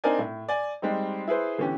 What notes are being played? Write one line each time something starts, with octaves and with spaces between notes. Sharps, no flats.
C4 D4 D#4 A#4 D5 G#5
A2
D5 G#5
G3 G#3 C4 D#4
E4 G#4 B4 C5
D3 E3 B3 C#4 G4